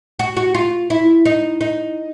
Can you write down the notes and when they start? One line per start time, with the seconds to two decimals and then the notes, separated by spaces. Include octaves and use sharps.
0.19 F#4
0.37 F#4
0.55 F4
0.90 E4
1.26 D#4
1.61 D#4